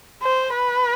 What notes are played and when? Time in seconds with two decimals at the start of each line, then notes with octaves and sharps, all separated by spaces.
0.23 C5
0.54 B4